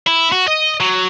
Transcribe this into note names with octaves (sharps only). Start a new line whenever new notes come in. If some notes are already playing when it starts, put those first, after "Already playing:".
E4
F#4
D#5
F#3